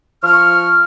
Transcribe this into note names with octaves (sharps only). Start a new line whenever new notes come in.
F3 C#6 F6